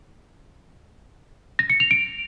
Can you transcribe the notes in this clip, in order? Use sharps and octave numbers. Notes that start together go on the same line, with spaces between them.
A#6
C#7
F7
D7